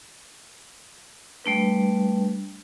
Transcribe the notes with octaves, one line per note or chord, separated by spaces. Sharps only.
G3 A3 D4 B4